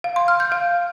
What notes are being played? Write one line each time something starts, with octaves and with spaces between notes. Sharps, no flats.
F5
C6
F6
G6
F5